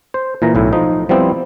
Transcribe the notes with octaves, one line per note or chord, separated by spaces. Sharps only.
C5
A#2 E3 A#5
B1 A2 E4
F3 D#4
F3 G3 B3 C4 E4